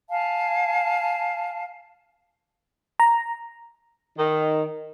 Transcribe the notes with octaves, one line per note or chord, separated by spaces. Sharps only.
F5 G#5 A5
A#5
D#3